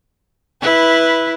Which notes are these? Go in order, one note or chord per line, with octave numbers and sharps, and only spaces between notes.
E4 B4